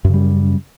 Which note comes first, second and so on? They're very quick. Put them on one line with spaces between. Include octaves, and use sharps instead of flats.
F#2 C#3 G3